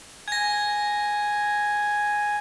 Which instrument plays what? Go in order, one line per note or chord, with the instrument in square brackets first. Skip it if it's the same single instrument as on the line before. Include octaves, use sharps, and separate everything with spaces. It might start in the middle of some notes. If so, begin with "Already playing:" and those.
[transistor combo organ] G#5 [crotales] G#6 A#6